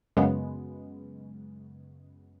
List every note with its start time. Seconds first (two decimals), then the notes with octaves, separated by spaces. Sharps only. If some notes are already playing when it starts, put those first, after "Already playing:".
0.17 F#2 C#3 G#3 B3